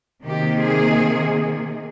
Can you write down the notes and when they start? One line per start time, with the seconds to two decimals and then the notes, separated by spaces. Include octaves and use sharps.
0.23 C3 D#3 A#3 G4
0.60 G#4